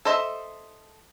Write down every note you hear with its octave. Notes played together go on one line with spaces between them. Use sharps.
A4 C5 D#5 E5